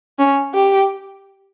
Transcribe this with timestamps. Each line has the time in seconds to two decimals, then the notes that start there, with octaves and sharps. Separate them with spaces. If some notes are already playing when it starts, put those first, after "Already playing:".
0.19 C#4
0.54 G4